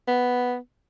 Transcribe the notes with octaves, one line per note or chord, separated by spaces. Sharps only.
B3